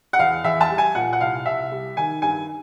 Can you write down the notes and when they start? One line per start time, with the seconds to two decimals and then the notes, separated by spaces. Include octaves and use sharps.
0.13 F#5
0.19 E2 F5
0.44 E2 E5
0.61 A5
0.69 G3
0.78 G#5
0.95 A#2 F#5
1.13 F#5
1.20 C2 F5
1.46 C2 E5
1.71 G3
1.97 D#3 G#5
2.22 G2 G#5